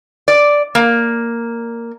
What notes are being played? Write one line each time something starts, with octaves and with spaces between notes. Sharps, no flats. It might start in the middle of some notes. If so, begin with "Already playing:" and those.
D5
A#3